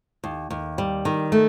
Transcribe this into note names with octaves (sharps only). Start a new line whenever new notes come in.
D#2
D#2
G3
D#3
A3